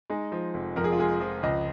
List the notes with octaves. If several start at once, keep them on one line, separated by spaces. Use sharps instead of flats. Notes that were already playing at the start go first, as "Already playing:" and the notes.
G#3 D#4
F3
F1
F2 A#4
G#4
F4
G#3 G#4
F3
C#2 D#5